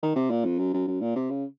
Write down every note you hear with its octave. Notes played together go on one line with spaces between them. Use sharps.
D#3
C3
A#2
F2
F#2
F#2
F#2
A#2
C3
C#3